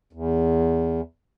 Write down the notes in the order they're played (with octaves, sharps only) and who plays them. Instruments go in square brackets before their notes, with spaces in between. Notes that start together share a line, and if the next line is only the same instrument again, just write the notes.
[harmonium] E2